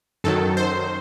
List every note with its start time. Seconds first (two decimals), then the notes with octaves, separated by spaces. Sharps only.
0.24 F#2 D#3 F#3 A4
0.57 C5